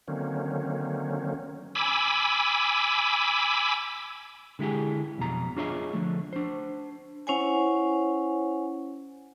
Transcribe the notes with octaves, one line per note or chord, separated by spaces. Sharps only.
D3 D#3 F#3 A#3 C4 C#4
G#5 B5 D6 E6
D3 G#3 E4 G4 G#4
B1 F2 B2 A#5
D4 F4 G#4 C#5 D#5 E5
D3 F3 A3
D4 C5
C#4 E4 C5 C#5 F#5 G#5